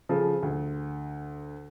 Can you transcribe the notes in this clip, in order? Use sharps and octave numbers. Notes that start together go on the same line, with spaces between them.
C#3 F3 G#4 A4
D2